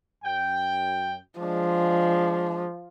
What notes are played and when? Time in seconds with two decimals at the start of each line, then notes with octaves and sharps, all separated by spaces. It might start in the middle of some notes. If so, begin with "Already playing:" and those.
0.24 F#2 G5
1.40 F3 G#3 D4